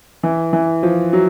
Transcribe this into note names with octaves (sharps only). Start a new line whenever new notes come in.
E3
E3
F3
F#3